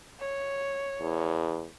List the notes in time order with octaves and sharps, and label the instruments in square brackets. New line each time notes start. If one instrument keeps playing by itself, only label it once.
[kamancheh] C#5
[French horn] E2